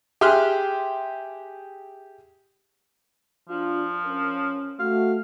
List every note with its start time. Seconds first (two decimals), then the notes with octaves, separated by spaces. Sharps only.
0.21 G4 G#4 E5 C6 F6 F#6
3.49 F3 D4 F4
4.06 C#4 A#4
4.79 A3 F#4 F5